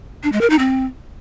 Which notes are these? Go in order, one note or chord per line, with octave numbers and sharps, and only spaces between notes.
D4
G#3
A#4
D#4
C4